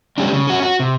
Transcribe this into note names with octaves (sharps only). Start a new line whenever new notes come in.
G3 G#3 C#4 D4
C#3
C#4 F#4
F#4
C3